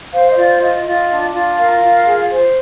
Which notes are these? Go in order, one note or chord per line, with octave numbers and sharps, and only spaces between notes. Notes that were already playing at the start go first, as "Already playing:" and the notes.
C5 F5
D#5
F4 D5
F4 D#5
F4
D4
F4
A#4 F5
F4
G#4
C5